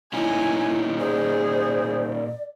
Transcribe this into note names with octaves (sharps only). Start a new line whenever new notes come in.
A#2 C#4 D#4 E4 G#5
G#4 C5 D5